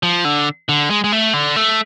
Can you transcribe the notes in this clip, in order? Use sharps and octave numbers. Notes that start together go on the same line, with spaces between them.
F3
D3
D3
G#3
G#3
A3
D3
A3